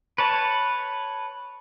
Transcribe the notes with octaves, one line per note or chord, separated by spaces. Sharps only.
B4 C#5 A5